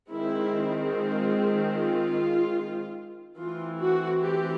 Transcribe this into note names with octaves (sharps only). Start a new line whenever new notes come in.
D#3 G#3 C4 E4
F4
F4
E3 A3 C4 F4
F#4
G4